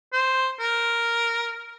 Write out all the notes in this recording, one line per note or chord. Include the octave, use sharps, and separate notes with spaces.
C5
A#4